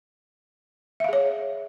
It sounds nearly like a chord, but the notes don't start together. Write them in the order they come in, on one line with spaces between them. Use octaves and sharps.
E5 F5 G#4 C#5